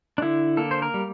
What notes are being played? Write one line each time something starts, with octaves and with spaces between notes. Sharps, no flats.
D4
D3 E4
A#3 A4
C5
A#4
G3